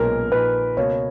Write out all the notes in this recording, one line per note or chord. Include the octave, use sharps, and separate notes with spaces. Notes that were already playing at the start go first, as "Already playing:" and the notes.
Already playing: B1 A#2 G#3 C#4 A#4
A#1 A#2 G#3 D#4 B4
C#2 B2 A#3 C#5